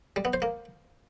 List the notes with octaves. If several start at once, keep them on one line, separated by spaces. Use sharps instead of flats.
G3
B3
C5
A#3